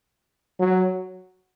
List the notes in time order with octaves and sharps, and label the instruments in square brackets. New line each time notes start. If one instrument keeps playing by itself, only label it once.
[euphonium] F#3